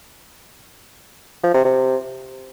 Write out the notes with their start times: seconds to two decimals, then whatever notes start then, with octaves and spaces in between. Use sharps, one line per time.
1.44 F3
1.54 C3
1.65 C3